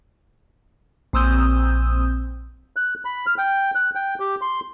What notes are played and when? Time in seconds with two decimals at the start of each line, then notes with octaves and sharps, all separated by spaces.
1.13 A#1 C4 D#6 E6 G6
2.76 F#6
3.05 B5
3.26 F6
3.38 G5
3.75 F#6
3.95 G5
4.20 G4
4.41 C6